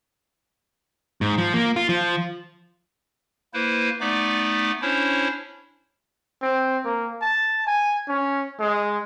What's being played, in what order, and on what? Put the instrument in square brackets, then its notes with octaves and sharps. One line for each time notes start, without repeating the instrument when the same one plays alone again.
[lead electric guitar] G#2
F3
A#3
F4
F3
[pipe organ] A#3 E4 B4 C5
A3 B3 D#4 D5 D6
C#4 D4 E4 C5 C#5
[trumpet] C4
A#3
A5
G#5
C#4
G#3